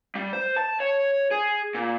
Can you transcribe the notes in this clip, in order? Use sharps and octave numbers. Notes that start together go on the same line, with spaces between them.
G3
C5
A5
C#5
G#4
A#2